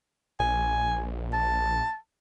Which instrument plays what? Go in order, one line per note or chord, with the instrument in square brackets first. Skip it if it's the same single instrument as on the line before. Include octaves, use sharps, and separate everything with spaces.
[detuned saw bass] A#1 [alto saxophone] G#5
[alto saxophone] A5